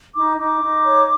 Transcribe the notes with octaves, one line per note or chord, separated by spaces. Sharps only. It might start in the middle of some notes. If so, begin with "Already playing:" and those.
D#4 D6
D#4 D6
D#4
C#5